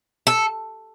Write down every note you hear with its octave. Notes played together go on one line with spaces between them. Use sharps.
A4